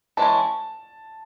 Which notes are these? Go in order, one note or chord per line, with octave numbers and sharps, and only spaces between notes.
E3 G#3 C#4 A5